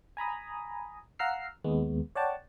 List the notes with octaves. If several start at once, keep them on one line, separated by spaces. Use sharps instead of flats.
G#5 A#5 B5 D#6
F5 F#5 A#5 E6 F6 C7
D#2 G#3 B3
C#5 D5 F#5 G5 A5